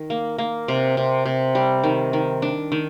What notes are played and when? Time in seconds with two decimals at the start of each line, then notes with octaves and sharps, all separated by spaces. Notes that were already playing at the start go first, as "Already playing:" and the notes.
Already playing: D#3
0.10 A#3
0.38 A#3
0.68 C3
0.97 C3
1.25 C3
1.55 G3
1.84 D#3
2.13 D#3
2.42 D4
2.72 D#3